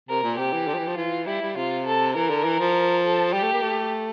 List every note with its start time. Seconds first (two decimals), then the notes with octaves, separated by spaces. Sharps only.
0.09 C3 A#4
0.23 A#2
0.38 C3 G4
0.53 E3
0.68 D3
0.74 F3
0.78 E3
0.87 F3
0.97 E3 F4
1.27 G3 E4
1.42 G3
1.56 C3 F4
1.86 A4
2.15 E3 A#4
2.30 D3
2.45 E3
2.59 F3
3.03 A4
3.33 G3 G4
3.43 A3
3.53 A#3
3.63 A3